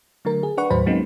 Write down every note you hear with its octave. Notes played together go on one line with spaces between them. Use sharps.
D3 F#3 A3 A#4
G#4
D4 B4 F#5 C#6
D#2 A2 F#3 B4 C5 B5
F#3 G#3 A#3 C4 C#4 D#4